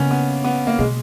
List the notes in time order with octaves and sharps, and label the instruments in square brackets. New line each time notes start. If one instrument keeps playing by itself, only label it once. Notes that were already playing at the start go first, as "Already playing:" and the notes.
Already playing: [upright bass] C#3 [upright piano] A#3 B3 C#4
[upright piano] B3
B3
A#3
[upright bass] B2 [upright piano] G#3